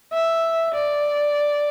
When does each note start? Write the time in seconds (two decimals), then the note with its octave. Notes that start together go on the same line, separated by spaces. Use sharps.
0.13 E5
0.74 D5